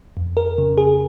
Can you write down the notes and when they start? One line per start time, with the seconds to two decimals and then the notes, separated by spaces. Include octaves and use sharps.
0.17 F2
0.37 A#4
0.58 C#3
0.78 G#4